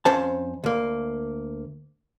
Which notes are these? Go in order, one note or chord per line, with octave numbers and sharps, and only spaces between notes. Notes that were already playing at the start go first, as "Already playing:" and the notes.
F2 C#4 C5 A5
D2 A#3